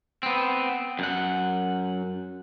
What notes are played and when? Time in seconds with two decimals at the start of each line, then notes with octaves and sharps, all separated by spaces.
0.23 B3 C4
0.99 F#2 F#5